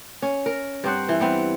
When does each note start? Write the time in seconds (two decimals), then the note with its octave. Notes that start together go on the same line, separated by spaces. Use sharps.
0.22 C#4
0.46 A#4
0.84 G2 C4 C5 F#5
1.09 E3
1.20 G3 B3 C4